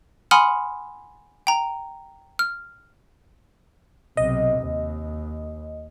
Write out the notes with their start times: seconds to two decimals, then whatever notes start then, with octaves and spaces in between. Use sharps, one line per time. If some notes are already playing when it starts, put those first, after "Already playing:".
0.31 F#5 G#5 B5 C6 D#6 F6
1.47 G5 A#5
2.39 F6
4.17 B1 C3 D#5
4.61 D#2